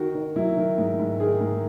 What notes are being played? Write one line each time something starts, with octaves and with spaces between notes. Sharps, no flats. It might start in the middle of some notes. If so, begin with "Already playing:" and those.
Already playing: D#3 F#4
D#3
F#3 E4
D#3
G#2
G#2
D#3 G#4
G#2